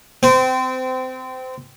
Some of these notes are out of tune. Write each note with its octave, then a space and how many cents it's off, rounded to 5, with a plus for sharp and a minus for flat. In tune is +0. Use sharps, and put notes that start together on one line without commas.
C4 -25